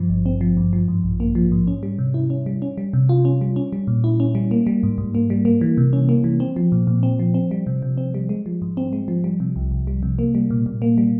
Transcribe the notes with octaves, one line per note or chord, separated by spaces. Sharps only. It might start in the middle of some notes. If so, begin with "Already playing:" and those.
Already playing: G2 F3
G#1
C4
F3
G2
F3
G#2
A#1
A#3
F3
G#2
C#4
G3
C3
E4
C#4
G3
C#4
G3
C3
F4
C#4
G3
C#4
G3
A#2
E4
C#4
G3
A#3
G3
G#2
G#2
A#3
G3
A#3
E3
C3
C#4
A#3
E3
C4
F3
A#2
A#2
C4
F3
C4
G3
C3
C3
C4
G3
G#3
F3
G#2
C4
G#3
F3
G3
C3
C2
C2
G3
C3
A#3
G3
A#2
A#2
A#3
G3